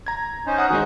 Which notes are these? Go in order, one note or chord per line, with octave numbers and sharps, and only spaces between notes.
A#5 G#6
C#4 D#4 C5
F#5 D#6 F#6
D#3 G#3 D#4 F#4 C5